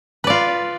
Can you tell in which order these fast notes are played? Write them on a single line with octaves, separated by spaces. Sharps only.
B4 D5 F4